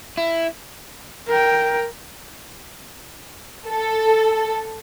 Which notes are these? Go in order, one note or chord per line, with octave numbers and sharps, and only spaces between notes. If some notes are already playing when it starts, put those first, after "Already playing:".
E4
A#4 G5
A4